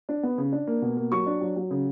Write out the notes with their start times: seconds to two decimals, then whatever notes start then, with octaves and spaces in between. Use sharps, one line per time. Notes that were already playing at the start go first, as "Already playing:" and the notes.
0.09 D4
0.23 B3
0.38 C#3
0.52 D4
0.67 A#3
0.82 B2
0.97 A#3
1.12 F#3 C#6
1.26 D4
1.41 F#3
1.56 F#3
1.71 C#3